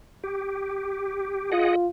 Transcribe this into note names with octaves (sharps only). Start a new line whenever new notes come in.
G4
F4 G#4 D#5 F#5